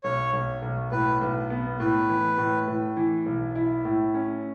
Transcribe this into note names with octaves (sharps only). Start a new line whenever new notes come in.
B1 C#5
B1
B1
A2 B4
B1
B3
A2 B4
E3
A2
A2
E3
B1
E4
A2
C#4